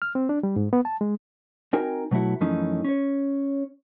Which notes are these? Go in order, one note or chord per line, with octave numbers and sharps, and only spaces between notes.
F6
C4
D4
G3
G#2
B3
A5
G#3
C4 D#4 F#4 A#4 G5 G#5
B2 F#3 A3 E4 F#4
F#2 E3 F3 A3 C#4 D#4
C#4 C#5